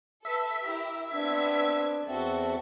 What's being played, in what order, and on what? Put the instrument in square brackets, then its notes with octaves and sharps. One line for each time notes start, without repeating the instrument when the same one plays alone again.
[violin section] A4 B4 [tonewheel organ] E5
[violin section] E4 G4 A#4
[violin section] B3 C4 G#6 [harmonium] D4
[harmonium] E2 C4 E5 [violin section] F#4 A4